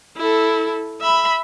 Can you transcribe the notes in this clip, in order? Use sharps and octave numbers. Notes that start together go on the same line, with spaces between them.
E4 A4
E5 B5